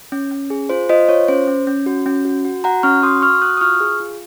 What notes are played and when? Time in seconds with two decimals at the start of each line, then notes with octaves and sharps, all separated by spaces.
0.12 C#4
0.31 C#4
0.50 G#4
0.69 F4 C5
0.89 F4 C5 D#5
1.09 F4 C#5
1.28 C#4 C5
1.47 C#4
1.67 C#4
1.86 F#4
2.06 C#4
2.25 F#4
2.45 F#4
2.64 F#4 F#5 A#5
2.83 C#4 C#6 F6
3.03 F#4 C6 D#6
3.22 F#4 C#6 F6
3.42 F#4 D#6 F#6
3.57 D#6
3.61 F4 C#6 F6
3.80 G#4
4.00 F4